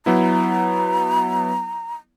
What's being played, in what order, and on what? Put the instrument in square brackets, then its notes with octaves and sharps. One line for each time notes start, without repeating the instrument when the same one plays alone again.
[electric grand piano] F#3 B3 E4 [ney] A#5